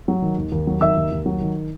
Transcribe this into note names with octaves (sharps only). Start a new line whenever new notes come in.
F#3
D#3
D#2
D#2
F#3
D#3 E5 E6
D#2
D#2
F#3
D#3